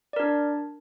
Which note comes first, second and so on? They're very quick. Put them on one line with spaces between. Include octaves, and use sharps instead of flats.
D5 A#4 D4